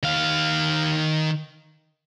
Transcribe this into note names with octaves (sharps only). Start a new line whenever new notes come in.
D#3 F5